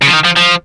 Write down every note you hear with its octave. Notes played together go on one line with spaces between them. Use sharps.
C#3
F3
D#3
F3
F3